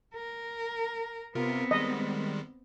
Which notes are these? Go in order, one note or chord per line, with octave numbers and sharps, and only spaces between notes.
A#4
C3 B3 C4 F4 A#4
D#3 G3 G#3 D#5